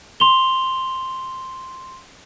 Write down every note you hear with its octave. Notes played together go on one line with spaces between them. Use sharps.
C6 F7 G7